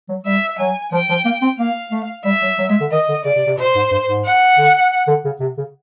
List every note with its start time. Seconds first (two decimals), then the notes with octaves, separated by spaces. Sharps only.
0.09 F#3
0.25 G3 E5
0.59 F#3 G#5
0.92 F3 G5
1.09 F3
1.25 A#3
1.42 C4
1.59 A#3 F5
1.91 A3
2.25 G3 E5
2.42 F#3
2.58 F#3
2.70 G#3
2.80 D3
2.91 D#3 D#5
3.09 D3
3.25 C#3 D5
3.36 C3
3.47 C3
3.58 B2 C5
3.75 G#2
3.91 G2
4.07 G#2
4.25 F#5
4.57 D3
5.08 D3
5.25 C#3
5.40 C3
5.57 C#3